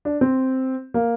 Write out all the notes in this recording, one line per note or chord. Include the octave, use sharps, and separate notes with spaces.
D4
C4
A#3